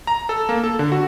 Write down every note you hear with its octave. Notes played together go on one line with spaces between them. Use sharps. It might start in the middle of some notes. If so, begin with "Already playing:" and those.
A#5
A4
A#3
A4
D3
F#4